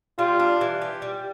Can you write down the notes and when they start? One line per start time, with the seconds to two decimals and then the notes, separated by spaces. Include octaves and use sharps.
0.19 G3 F4
0.40 D4
0.61 E3
0.82 G4
1.02 G3